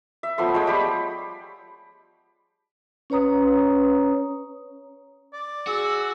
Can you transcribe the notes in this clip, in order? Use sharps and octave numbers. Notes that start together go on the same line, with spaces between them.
E5
F3 A3 B3 C6
G#3 C5 C#5 G5
G3 B5
C#4 B4 C#5 A#5 D#6
D5
F#4 G#4 E6